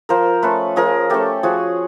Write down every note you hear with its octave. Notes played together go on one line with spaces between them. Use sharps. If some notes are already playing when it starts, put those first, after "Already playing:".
F3 A#4 C5
A3 C#4 A4 B4
F3 G#4 A#4
A3 C#4 G4 A4
F3 F#4 G#4